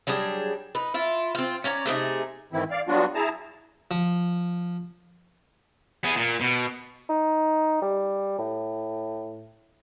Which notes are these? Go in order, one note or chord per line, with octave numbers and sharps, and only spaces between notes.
F#3 G3 D4 G#4
D#4 B4
E4 F4
C4 F4
C#4 C#5 D5 A#5
C3 A3 D#4 G#4
G#2 D#3 E3 C4 E4
D5 F5
F#3 G3 B3 D4 F4 F#4
E4 G#4 A5 A#5
F3
B3 G#4
A#2
B2
D#4
G3
A2